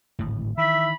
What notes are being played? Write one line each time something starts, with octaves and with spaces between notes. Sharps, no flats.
D1 G#1 A2
D#3 E3 E5 B5